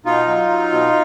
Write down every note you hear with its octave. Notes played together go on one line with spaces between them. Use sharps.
B2 D#4 F4
F#3
F#3
B2